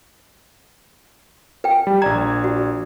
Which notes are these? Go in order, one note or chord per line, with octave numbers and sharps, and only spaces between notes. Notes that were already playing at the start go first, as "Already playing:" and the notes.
B4 G5
G3
A#1 D5 A#5 G#6
F#4